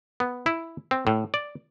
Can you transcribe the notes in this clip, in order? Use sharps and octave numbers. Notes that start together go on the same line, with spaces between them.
B3
E4
C4
A2
D5